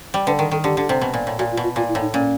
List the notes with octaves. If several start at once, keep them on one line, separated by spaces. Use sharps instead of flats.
G3
D3 B4
D#3 A#4
D#3 A4
D3 G4
D3
C3
B2
A#2
A2
A#2 F#4
F4
B2
F4
A#2 F4
E4
A2
D#4
A#2 C#4